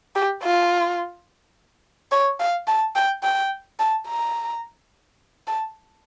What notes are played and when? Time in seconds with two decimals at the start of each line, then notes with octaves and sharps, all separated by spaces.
0.15 G4
0.44 F4
2.11 C#5
2.40 F5
2.68 A5
2.96 G5
3.23 G5
3.79 A5
4.08 A#5
5.47 A5